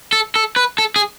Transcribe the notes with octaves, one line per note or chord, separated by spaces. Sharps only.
A4
A4
B4
A4
G#4